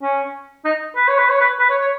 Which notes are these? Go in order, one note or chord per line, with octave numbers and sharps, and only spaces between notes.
C#4
D#4
B4
C#5
B4
C#5
B4
B4
C#5
C#5